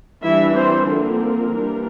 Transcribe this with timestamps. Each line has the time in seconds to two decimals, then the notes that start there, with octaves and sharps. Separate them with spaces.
0.23 E3 G3 D4 E4 E5
0.55 C4 C5
0.87 D3 F3 A#3 C4 A#4
1.52 E3 G3 A#3 D4